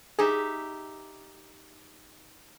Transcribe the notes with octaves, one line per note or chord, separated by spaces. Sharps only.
D#4 G4 G#4 E5